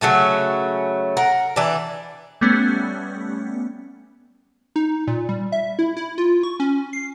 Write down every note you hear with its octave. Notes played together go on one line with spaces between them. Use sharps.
C#3 F#3 A3 C#4
A#4 F#5
E3 D4
G3 A3 B3 C#4
D#4
A#2
G3
E5
E4
E4
F4
C#6
C#4
C7